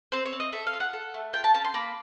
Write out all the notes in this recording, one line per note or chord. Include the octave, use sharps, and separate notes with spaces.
C4 C5
C#5
C4
D#5
A4 E5
F5
F4
F#5
A4
A3
F4 G5
A5
C#4 A5
C6
A#3 B5